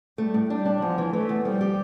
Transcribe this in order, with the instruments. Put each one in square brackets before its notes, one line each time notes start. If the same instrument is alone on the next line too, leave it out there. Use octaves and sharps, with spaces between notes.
[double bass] G3 [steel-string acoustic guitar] A3
[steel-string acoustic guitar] A2
[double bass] G3 [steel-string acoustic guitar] D4
[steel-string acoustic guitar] D4
[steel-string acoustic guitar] E2 [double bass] F3
[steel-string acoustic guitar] E3
[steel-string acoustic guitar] E3 [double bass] A3
[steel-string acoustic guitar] E2
[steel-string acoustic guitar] F3 [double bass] G3
[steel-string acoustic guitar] G4